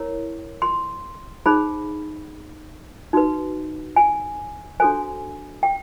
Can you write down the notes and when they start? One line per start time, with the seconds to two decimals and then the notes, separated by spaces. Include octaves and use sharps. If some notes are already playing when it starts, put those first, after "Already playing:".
Already playing: E4 A#4 C#5
0.62 C6
1.46 D#4 G#4 C5 B5
3.13 D#4 F#4 B4
3.96 G#5
4.80 D4 F#4 A4 C5 G#5
5.63 G5